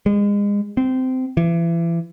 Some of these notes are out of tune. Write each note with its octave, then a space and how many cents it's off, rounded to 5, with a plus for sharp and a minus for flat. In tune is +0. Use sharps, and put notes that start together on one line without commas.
G#3 -30
C4 -20
E3 +35